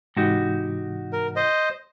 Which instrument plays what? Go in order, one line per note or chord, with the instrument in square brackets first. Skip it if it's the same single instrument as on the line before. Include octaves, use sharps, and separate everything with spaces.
[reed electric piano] G#2 C3 E3 [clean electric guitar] D#4 F#4 G4
[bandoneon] A#4
C5 D#5